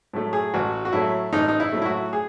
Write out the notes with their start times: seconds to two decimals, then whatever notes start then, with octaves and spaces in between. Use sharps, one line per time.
0.13 A2 F#3 A3
0.33 G#4
0.54 A1 F#4
0.85 F#4
0.92 A2 F#3 A3 E4
1.33 A1 D#4
1.48 D#4
1.60 E4
1.72 A2 F#3 A3
1.82 E4
1.85 F#4
2.13 G#4